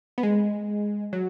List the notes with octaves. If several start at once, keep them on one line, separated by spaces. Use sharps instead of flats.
B3
G#3
F#3